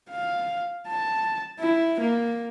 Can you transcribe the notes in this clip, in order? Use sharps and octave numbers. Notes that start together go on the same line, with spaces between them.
F5
A5
E4
A#3